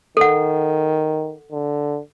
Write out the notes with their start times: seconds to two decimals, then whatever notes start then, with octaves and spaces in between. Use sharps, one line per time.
0.17 D#3 A4 F#5
1.52 D3